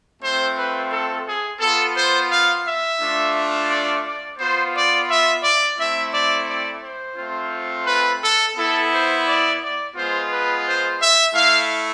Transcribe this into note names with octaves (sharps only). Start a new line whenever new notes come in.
A3 C4 F4 C5
B4
A4
G#4
B3 F4 A4
C5
F5
E5
A3 D4 F4
D5
D5
B3 F4 C5
D5
E5
D5
A3 C4 E4 E5
D5
D5
C5
A3 C4 F4
B4
A4
B3 E4 A4
C5
D5
D5
G#3 B3 F4 C5
B4
C5
E5
A3 E4 F5